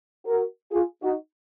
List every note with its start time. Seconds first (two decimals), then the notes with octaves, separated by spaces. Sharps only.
0.26 F#4 A#4
0.71 F4 G#4
1.02 D#4 F#4